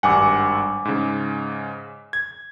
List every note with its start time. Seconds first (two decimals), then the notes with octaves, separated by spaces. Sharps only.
0.03 G#1 G2 F#5 G#5 D6
0.85 G#2 C#3
2.13 G#6